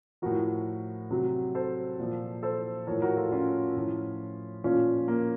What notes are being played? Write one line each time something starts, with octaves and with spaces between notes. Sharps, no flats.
A2 F3 F#4 A#4
C3 F#3
A4 C5
A#2 F3
A4 C5
A2 F3 A#4 C#5
F#4 A#4
F4 A4
C#4 F4
A2 F3
A#2 F3 C#4 F4
A#3